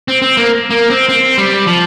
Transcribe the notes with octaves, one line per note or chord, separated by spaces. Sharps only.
C4
C4
A#3
A#3
C4
C4
G3
F3